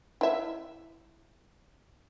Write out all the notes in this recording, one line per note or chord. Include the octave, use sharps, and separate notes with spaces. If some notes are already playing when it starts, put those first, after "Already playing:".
E4 E5